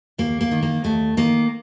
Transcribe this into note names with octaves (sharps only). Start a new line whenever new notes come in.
D#2 A#3
A#3
D#3
A#3
D#2 A3
D#3 A#3